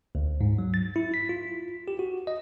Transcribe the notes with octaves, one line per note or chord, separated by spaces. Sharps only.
D2
G#2
F#3
A6
E4
B6
F4
G4
F#4
D#5